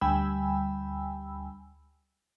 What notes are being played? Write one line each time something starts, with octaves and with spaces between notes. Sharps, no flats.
D2 G3 G5 G#5 B5 E6